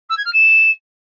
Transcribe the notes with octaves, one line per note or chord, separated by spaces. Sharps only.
E6
G#6
F6
E7